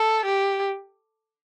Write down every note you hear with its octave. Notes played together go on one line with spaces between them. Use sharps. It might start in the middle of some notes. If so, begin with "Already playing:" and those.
Already playing: A4
G4